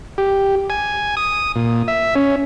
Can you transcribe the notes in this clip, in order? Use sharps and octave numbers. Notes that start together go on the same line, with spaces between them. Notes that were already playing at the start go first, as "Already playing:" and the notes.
G4
G#5
D#6
A#2
E5
C#4